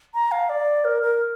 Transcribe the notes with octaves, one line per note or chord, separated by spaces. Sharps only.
A#5
F5
D5
A#4
A#4